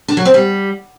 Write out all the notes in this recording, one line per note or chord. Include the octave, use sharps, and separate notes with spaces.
D4
F#3
C4
G3